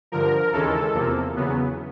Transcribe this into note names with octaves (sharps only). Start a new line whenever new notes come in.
G2 D3 F3 A#4
D#2 C#3 E3 G#3 C#4 A4
E2 C3 F3 A#3
E2 C#3 F#3 B3